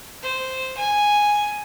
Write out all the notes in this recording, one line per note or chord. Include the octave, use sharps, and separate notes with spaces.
C5
G#5